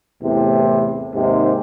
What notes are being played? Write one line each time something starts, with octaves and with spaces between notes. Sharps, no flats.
E2 A2 C3
D#2 G#2 C3